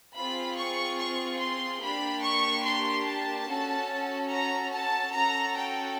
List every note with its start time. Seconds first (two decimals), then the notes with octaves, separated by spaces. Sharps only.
0.17 C4 F4 G#4 B5
0.58 C#6
1.00 C#6
1.41 C6
1.82 A#3 D4 G4 B5
2.24 C#6
2.66 C6
3.07 A5
3.48 C#4 F#4 A4
4.31 A#5
4.73 A5
5.14 C#4 F#4 A4 A#5
5.56 G5